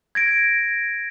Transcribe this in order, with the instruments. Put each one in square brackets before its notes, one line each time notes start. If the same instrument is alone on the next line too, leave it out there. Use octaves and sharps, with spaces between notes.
[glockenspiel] G#6 A#6 D7